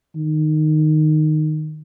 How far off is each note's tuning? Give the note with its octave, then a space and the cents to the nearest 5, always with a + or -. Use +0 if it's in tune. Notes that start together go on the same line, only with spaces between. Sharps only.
D#3 -15